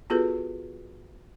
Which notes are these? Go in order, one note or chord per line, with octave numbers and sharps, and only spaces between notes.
B3 F4 F#4 G#4 A4 B4